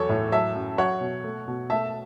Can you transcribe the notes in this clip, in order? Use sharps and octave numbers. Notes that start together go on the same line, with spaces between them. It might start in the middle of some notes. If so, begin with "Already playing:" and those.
Already playing: E2 F#3 A4 C#5
A2
F#3 E5 A5
F#2
F#3 C#5 F#5
B2
A3
B2
A3 E5 A5